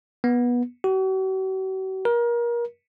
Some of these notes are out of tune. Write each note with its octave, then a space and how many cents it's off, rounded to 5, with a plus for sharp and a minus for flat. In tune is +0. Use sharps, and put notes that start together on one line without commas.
B3 -20
F#4 +45
A#4 +30